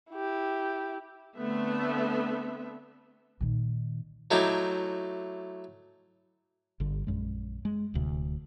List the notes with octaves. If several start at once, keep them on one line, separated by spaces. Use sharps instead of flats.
E4 G4
D3 A3 B3 C4 E5
A#2 D#3
F#3 A3 D#4 E4 G4
G1 D3
A#1 F#2 G#3
G#3
D1 D2 C3